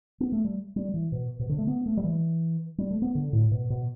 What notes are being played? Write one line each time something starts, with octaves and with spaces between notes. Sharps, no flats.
B3
A3
G3
G3
E3
B2
B2
D3
A3
B3
A3
G3
E3
G3
A3
B3
D3
A2
B2
B2